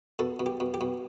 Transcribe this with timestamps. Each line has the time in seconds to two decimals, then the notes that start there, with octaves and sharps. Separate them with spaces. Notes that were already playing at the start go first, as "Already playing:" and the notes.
0.19 B2 A4
0.40 B2
0.46 G4
0.60 B2
0.74 G4
0.81 B2